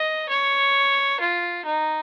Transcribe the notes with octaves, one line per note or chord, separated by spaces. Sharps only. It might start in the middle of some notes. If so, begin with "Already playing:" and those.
Already playing: D#5
C#5
F4
D#4